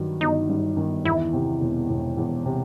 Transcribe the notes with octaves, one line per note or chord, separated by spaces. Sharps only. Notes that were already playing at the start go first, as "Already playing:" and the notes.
Already playing: G2 D#3 F#3
G1 D#4
G2
D#3
E2 E4
C3
E1
E1
E2
C3